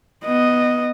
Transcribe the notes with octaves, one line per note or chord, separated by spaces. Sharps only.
B3 D#5